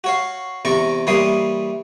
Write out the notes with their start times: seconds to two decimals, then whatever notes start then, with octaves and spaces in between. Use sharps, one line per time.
0.04 F#4 C#5 F5
0.65 E2 C3 D5 A#5 C#6
1.07 E3 G3 A#3 C#5 C6 D#6